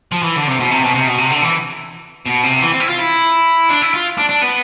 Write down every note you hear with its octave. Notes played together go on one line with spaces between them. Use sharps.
F3
E3
D3
C3
B2
C3
B2
C3
B2
C3
D3
E3
B2
C3
E3
C4
E4
F4
E4
D4
E4
F4
D4
D4
B3